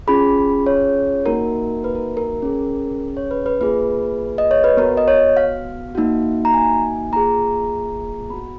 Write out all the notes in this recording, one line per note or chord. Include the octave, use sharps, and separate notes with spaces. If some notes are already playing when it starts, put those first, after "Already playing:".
C#4 F4 G#4 B5
C#5
A#3 D#4 F#4 A#4
B4
A#4
A#4
C#4 G#4
C#5
B4
B4
A#3 F4 G#4 B4
D#5
C#5
B4
B3 F#4 A#4
D#5
C#5
F5
A#3 D#4 F#4
A#5
G#5
A#3 F4 G#4 A#5
B3 F#4 B5